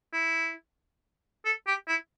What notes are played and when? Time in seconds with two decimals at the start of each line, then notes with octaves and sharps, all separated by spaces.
0.13 E4
1.45 A4
1.67 G4
1.88 E4